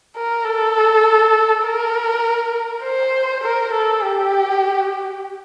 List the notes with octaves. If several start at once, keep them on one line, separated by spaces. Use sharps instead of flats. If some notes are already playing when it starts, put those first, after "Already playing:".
A#4
A4
A#4
C5
A#4
A4
G4